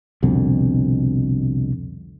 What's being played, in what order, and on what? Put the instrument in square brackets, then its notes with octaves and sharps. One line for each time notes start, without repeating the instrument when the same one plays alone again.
[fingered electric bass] C2 F2 B2 D3